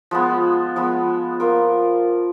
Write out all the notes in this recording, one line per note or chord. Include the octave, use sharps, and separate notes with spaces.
F3 G#3 B3
F3 G#3 B3
A#3 F4 A#4